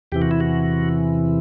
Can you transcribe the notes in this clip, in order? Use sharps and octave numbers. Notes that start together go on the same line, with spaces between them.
E2 C3 E3 G4
F#4
E4
F#4